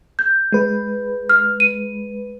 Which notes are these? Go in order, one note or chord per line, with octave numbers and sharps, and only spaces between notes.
G6
G#3 B4
F6
D#7